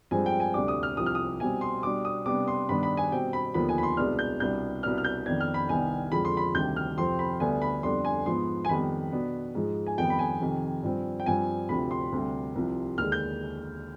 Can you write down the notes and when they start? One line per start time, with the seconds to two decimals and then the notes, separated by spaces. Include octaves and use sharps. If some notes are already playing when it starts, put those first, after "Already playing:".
0.11 G2 F3 G#3 C4 G#5
0.26 G5
0.40 G#5
0.54 D2 C3 G3 D4 D6
0.68 D#6
0.83 F6
0.97 C2 C3 F3 D#6
1.06 F6
1.15 D#6
1.40 B2 G3 C4 G#5
1.61 C6
1.83 B2 G3 D4 D6
2.05 D#6
2.26 C3 G3 B3 D4 D6
2.48 C6
2.69 G2 D#3 B3 D4 B5
2.83 B5
2.97 G#5
3.12 B2 G3 C4 G5
3.33 B5
3.54 D#2 D3 F3 B3 B5
3.69 G#5
3.78 B5
3.83 C6
3.97 C2 B2 G#3 B3 D4 F6
4.19 G6
4.40 C2 B2 G3 B3 D4 G6
4.83 C2 B2 B3 D4 F6
4.98 F6
5.04 G6
5.26 F2 D#3 B3 D4 G#6
5.40 F6
5.54 B5
5.69 C2 C3 D#3 B3 D4 G#5
6.11 F2 D3 F3 G#3 B5
6.25 C6
6.37 B5
6.55 D2 C3 D#3 G3 G6
6.76 F6
6.98 F2 C3 F3 C4 C6
7.19 B5
7.40 D2 D3 G3 B3 D4 G#5
7.62 B5
7.83 F2 D3 G3 B3 D4 C6
8.05 G#5
8.26 G#2 F3 B3 C6
8.65 G#5
8.69 F2 D#3 G3 B3 B5
9.12 B2 B3 D4
9.55 G#2 F3 G#3
9.86 G#5
9.98 F2 D#3 G3 B3 G5
10.10 B5
10.19 G#5
10.41 F2 C3 D#3
10.83 G2 F3 C4
11.20 G5
11.26 G2 F3 C4 G#5
11.69 D2 C3 F3 C4 B5
11.91 C6
12.12 D2 C3 G3
12.55 C2 C3 F3
12.98 D#2 D3 G#3 F6
13.12 G6